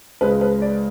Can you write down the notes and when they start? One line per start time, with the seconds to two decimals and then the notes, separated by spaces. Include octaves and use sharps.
0.21 C#2 C#3 G#3 B4
0.41 B4
0.62 D5